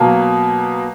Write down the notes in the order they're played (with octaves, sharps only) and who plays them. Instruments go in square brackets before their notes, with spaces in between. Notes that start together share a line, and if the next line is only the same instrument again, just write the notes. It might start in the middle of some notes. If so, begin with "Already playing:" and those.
Already playing: [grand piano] B2 F#3 A#3